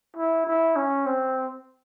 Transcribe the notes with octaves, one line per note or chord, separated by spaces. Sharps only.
E4
E4
C#4
C4